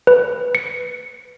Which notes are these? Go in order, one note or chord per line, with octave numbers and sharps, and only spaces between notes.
B4
C#7